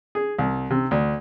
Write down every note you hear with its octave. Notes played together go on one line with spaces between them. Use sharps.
G#4
C2
C3
D2